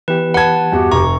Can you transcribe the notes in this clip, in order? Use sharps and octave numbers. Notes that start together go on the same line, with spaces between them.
E3 B3 G4 B4
B4 F#5 A5 G#6
E2 G2 F#4 G4
F1 A#5 C#6